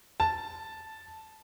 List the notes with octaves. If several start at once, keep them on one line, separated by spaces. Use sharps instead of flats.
A5